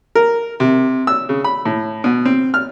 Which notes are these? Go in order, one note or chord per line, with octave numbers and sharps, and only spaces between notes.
A#4
C3
E6
C#3
B5
A2
B2
C4
F6